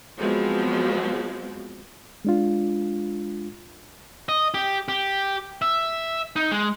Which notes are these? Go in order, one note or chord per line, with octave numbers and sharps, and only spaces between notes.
F3 F#3 G#3 B3 C4
G#3 D4 F4
D#5
G4
G4
E5
D#4
G#3